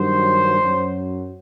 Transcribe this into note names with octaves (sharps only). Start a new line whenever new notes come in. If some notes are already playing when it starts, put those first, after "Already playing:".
Already playing: G2 D#3 F#3 C5
F#2 F#3